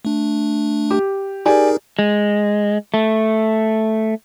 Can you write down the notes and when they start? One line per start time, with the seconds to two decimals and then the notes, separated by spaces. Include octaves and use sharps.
0.05 A3 D4
0.91 G4
1.46 D#4 G4 G#4 A#4 D5 G#5
1.99 G#3
2.94 A3